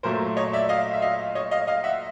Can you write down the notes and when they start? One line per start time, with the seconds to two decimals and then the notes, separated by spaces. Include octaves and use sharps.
0.03 A#2 F#3 A3 A#4 C5
0.37 C#5 D#5
0.53 D5 E5
0.69 D#5 F5
0.93 E5
1.02 D#5 F5
1.35 C#5 D#5
1.51 D#5 F5
1.67 D#5 F5
1.84 E5 F#5